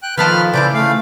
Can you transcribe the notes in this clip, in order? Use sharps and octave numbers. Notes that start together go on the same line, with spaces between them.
G5 F#6
D#3 F3 A4 B4 B5 F6
C#3 E3 E4 C5 D5 D6
A3 F5